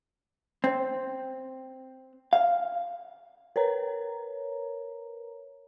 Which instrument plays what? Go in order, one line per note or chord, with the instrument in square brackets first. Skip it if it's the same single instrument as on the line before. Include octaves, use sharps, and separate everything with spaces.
[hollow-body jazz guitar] C4
F5
[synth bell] A#4 B4 C#5 A#5